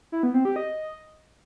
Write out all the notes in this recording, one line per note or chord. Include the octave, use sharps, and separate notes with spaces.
E4
B3
C4
G4
D#5